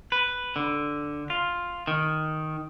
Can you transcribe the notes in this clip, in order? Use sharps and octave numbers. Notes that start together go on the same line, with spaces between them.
B4
D3
F4
D#3